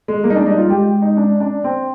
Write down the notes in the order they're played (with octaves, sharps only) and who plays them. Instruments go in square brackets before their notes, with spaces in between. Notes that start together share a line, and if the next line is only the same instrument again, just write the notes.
[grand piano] G#3
[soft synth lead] G3 [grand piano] A#3
[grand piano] D#4
[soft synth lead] G#3 [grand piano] D4
[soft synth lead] G3 [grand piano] D#4
[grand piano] F4
[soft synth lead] G3
[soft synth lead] G#3 [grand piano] G4
[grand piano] D#4
D4
D4
C4